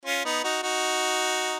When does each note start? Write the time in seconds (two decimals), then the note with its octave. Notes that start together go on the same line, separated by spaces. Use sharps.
0.06 C#4 F4
0.25 B3 D#4
0.44 D#4 F#4
0.63 D#4 F#4